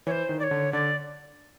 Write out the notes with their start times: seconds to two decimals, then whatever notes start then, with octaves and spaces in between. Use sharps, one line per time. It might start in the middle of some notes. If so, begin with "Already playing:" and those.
0.07 E3 C5 C#5
0.29 D#3
0.39 D5
0.43 C#5
0.51 D3
0.73 D3 D5